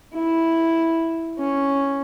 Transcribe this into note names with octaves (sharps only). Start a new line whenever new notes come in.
E4
C#4